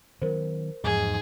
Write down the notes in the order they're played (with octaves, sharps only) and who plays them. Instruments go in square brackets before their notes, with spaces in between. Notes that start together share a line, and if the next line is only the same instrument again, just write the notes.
[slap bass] D#3 F#3 B3 [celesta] A#4 C5
[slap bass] E2 F3 F#3 [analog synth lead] G#2 [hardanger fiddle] G#4